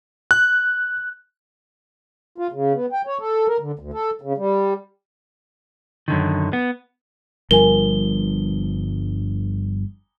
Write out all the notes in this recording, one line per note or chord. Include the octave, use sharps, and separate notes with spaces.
F#6
F4
C#3
B3
G5
C#5
A4
A#4
D3
D2
A4
C#3
G3
F#2 D3 D#3
B3
G1 G2 F3 A#4 G#5 G7